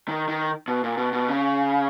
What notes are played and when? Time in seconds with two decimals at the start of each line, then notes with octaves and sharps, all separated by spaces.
0.09 D#3
0.28 D#3
0.68 B2
0.84 A#2
0.97 B2
1.13 B2
1.29 C#3